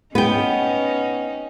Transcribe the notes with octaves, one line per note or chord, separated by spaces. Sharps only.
B3 C#4 D#4 G5